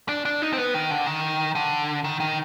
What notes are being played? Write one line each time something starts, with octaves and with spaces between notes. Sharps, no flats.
D4
D4
D#4
C4
B3
D#3
D3
D#3
D3
D#3
D#3